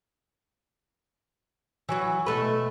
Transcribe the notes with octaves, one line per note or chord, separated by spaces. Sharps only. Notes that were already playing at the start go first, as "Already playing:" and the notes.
E3 F#3 F#4
B2 A3 B4